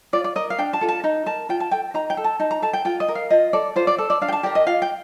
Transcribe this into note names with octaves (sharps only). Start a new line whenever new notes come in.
F4 D5
D5
A#4 D#5
F5
D4 G5
A5
F4 A4
A5
D#4 A#5
A#4 A5
F4 G5
A5
A4 G5
D#4 A#5
G5
A4
A5
D#4 A5
A#5
A4 A5
G5
F4 G5
D#5
A#4
F5
F4 D#5
A4 D5
F4 C5
D5
A4
D5
D4 F5
G5
A5
G4 A#4 D5
D#5
F4 F5
G5